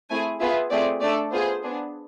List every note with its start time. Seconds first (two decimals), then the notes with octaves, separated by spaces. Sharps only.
0.10 A3 C4 E4 G#4 G#5
0.40 B3 F4 G#4 E5
0.70 A3 C4 F4 G#4 D5
1.01 A3 D4 A4 D5
1.31 B3 F4 G#4 C5
1.63 B3 D4 G#4